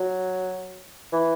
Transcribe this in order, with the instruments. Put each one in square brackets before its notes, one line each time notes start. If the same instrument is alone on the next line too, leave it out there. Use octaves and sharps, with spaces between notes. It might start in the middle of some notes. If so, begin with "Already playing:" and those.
Already playing: [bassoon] F#3
E3